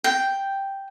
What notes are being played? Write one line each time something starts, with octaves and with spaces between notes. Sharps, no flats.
G5